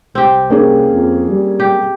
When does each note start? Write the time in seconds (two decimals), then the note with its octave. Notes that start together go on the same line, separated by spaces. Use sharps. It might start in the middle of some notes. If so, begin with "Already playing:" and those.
0.15 C2 C4 G4
0.50 A#3 C#4 G#4
0.92 F2
1.30 G3
1.60 G4